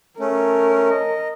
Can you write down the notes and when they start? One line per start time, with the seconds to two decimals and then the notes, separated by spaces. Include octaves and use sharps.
0.20 A3 C#4 A#4
0.90 D#5